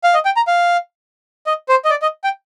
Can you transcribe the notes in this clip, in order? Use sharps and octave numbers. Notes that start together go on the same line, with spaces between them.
F5
D#5
G5
A#5
F5
D#5
C5
D#5
D5
D#5
G5